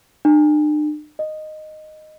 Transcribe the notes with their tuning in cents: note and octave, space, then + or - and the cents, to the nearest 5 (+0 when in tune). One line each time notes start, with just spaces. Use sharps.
D4 +45
D#5 -10